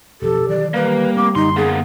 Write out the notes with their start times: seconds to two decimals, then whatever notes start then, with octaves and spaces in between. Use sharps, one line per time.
0.22 B1 F2 F3 G4 A4
0.49 D#3 E3 F#3 D5
0.74 G3 A#3 B4
1.17 A3 C4 D6
1.35 F#2 D3 D#4 C6
1.56 A#3 B3 G#4